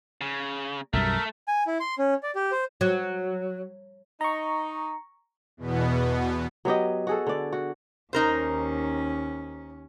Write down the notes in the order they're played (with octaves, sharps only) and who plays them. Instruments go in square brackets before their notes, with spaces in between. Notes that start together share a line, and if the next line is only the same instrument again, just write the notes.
[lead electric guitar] C#3
[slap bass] B1 F#2 G3 [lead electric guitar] A3 [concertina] A#4 E5
[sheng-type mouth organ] G#5
E4
C6
C#4
D5
G4
C5
[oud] F#3
[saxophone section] D#4 [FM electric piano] A#5 C#6
[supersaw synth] E2 B2 B3
[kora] F#3 B3 G4 D#5
F#4 G#4 A4
D3 D5
F#4
[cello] D#2 C#4 [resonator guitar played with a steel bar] D#4 A#4 C5